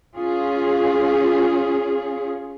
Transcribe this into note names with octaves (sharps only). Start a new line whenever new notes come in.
C#4 F4 G#4